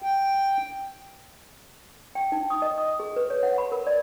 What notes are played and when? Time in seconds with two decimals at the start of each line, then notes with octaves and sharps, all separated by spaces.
0.02 G5
2.15 G5
2.32 D#4
2.50 D#6
2.62 D#5
2.78 D#6
3.00 G#4
3.16 B4
3.30 C#5
3.43 F#5
3.58 B5
3.72 A#4
3.87 D5